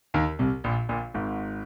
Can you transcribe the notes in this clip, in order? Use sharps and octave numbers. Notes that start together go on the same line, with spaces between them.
D#2 D#3
C2 C3
A#1 A#2
A#1 A#2
G#1 G#2